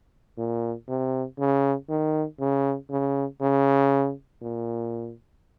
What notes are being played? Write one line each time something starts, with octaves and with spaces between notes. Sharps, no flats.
A#2
C3
C#3
D#3
C#3
C#3
C#3
A#2